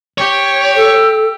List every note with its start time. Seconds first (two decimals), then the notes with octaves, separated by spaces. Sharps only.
0.18 G4 C#5
0.76 A4